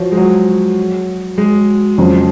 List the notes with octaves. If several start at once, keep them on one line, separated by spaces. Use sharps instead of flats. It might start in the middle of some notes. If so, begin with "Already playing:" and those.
Already playing: F3 F#4 C#5
G#3
F#3
G#3
F2 C#3 F#3